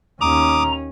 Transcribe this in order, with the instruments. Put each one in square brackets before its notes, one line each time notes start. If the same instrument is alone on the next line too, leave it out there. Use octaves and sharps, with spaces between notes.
[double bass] D#2 C#4 [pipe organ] A#5 [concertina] D6 D#6